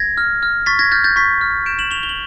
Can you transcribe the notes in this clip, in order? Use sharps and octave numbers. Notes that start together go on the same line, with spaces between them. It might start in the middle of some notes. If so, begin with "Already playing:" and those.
Already playing: G#6 A#6
F6
F6
C#6 A6 B6
G#6 A#6
F6 G6 A6
G6 A6
C#6 A6 B6
F6
G6 D7 E7
E7 F#7
C#6 F7 G7
F7 G7
F#7